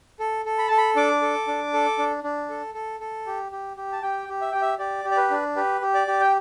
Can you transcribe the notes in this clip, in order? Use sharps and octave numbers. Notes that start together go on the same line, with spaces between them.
A4
A4
B5
A4 A5
B5
D4 D6
A4
D4
A4
D4
D4
A4
A4
A4
G4
G4
G4
A5
G4 G5
G4
E5
G4 G5
E5
G4 D5
G4
D5
B4
D4
G4 B4
G4
D5
G4
G5